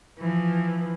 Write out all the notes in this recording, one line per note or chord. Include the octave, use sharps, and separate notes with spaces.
E3 F3